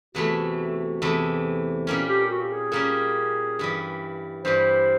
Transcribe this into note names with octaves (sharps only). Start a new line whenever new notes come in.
E2 C3 E3 A3 F#4
E2 C3 E3 A3
A#2 G3 A#3 C#4
G4
F#4
G4
G#4
A#2 G3 A#3 C#4
G2 E3 G3
G2 E3 G3 C5